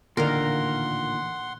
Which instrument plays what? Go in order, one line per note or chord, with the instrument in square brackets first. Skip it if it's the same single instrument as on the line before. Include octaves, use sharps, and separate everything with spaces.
[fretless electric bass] A1 D3 D#3 [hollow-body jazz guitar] A#2 [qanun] A#4 F5 [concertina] F#5 C6